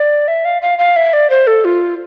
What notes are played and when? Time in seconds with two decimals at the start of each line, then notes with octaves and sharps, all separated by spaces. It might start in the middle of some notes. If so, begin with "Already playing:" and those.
Already playing: D5
0.28 E5
0.45 F5
0.62 F5
0.79 F5
0.96 E5
1.13 D5
1.30 C5
1.47 A4
1.65 F4